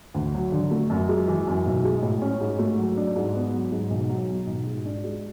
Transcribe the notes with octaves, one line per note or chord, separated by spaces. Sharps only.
D2
F#3
D3
A3
F#2
G#3
E3
F#2
B1
G#3
A2
C#4
G#2
A3
F#3
D4
G#2
B3
F#3
G#2
B1
F#3
B2
B1
G#2
D4
G#3